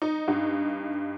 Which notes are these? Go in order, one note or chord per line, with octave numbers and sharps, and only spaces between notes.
D#4
G2